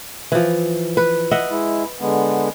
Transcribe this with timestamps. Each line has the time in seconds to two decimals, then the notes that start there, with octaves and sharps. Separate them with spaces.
0.32 E3 F3
0.97 B4
1.31 D#5 E5 F#5
1.51 G#3 E4
2.01 D3 G#3 B3